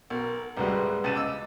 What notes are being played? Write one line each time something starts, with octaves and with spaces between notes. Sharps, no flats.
B1 A#4
A1 D2 G3 G#3 F#4 B4
C#2 A6 D#7 E7
D#5 D6 E6